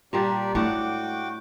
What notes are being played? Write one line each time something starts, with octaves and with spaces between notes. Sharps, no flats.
A#2 G3 A#3 D4 G4 D5
A2 G#3 A3 D4 F#4 F#5 G5 D6